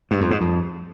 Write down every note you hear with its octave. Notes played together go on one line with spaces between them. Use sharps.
G2
F2
G#2
F2